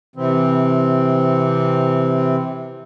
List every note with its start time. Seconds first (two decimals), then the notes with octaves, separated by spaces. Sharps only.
0.16 C3 E3 C4